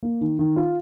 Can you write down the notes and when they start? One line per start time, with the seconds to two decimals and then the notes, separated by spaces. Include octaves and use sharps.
0.03 A#3
0.21 D#3
0.39 D#3
0.56 F4